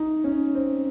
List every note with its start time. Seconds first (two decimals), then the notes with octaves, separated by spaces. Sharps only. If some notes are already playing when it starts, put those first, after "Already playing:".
Already playing: D#4
0.24 C#4
0.55 C4